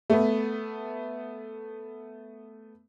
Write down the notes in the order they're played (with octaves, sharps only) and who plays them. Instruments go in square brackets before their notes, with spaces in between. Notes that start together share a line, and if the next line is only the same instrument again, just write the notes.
[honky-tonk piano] A3 B3